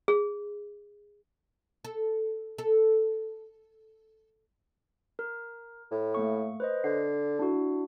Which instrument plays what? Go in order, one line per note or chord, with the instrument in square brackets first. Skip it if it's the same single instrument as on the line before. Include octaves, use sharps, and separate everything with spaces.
[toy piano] G#4
[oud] A4
A4
[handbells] A#4
[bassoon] A2
[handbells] A3 A#3 C#6
B4 C5 D#5
[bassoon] D3 [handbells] C7
[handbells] D4 E4 F#4